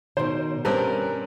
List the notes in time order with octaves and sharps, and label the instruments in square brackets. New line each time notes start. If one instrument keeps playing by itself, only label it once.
[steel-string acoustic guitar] B2 D#3 [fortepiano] C5
[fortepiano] G2 [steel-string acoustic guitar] C4 C#4 A#4